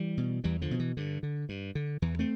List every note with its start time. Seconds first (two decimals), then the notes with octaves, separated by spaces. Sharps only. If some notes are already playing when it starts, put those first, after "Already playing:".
Already playing: E3 G3
0.17 B2
0.44 E2 E3 G3
0.62 D3 F3
0.71 B2
0.80 E3
0.97 G2 D3
1.23 D3
1.49 G2
1.75 D3
2.02 E2 E3
2.19 A3 C4